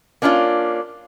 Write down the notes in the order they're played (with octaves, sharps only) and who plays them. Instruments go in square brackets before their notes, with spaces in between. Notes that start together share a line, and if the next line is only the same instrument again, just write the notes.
[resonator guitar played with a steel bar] A#3 C#4 D4 E4 F4